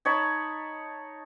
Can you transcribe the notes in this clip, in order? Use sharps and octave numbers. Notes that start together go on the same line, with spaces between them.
D#4 C#5 A5 B5